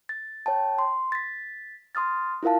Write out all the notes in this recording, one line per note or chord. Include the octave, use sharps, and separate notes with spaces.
A6
C#5 G5 A5
C6
A6 B6
C6 D#6 F6 A6
E4 F4 A#4 F5 A5